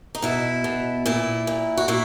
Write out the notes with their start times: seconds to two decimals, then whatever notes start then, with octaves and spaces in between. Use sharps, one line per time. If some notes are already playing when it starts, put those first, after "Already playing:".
0.15 D#4
0.22 B2 E4
0.64 B2
1.06 A#2 E4
1.47 A#2
1.77 F#4
1.88 A#2 E4